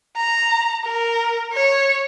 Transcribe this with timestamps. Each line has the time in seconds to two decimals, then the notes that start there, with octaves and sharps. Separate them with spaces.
0.16 A#5
0.85 A#4
1.54 C#5